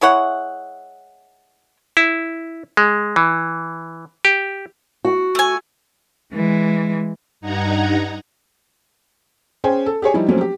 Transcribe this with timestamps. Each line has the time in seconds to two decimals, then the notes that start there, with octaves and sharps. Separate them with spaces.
0.01 G#3 E4 C#5 F#5
1.97 E4
2.77 G#3
3.16 E3
4.25 G4
5.05 F#4
5.35 A3 G#5
6.34 E3 G#3
7.41 G2 D#4 F#5 A#5 G#6
9.64 C#4 G#4 C5 G5 G#5
9.86 A4
10.02 G4 G#4 C#5 G#5
10.14 F3 G3 D#4 E4
10.28 F3 F#3 A3 A#3 C4 C#4
10.41 G4